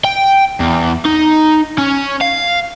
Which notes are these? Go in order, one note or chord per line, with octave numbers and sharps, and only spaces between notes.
G5
E2
D#4
C#4
F5